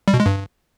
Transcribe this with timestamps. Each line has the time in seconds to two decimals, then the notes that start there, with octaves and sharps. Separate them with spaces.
0.08 G3
0.14 B2
0.20 G#3
0.26 G2